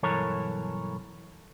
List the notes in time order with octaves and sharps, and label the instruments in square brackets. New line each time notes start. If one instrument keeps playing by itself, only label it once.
[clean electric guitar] B1 G2 E3 A4 A#4 C#5